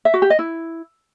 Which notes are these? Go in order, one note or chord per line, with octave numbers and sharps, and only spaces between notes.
E5
F#4
G4
D#5
E4